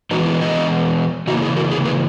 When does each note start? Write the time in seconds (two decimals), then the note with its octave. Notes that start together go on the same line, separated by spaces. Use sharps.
0.11 E3 G#3 B3 D#4 F#4
0.26 E4 G#4
0.41 B4 D#5
1.27 C#3 E3 A#3 D#4 F#4
1.42 E4 G#4
1.57 F#4 A#4
1.71 E4 G#4
1.85 G#4 B4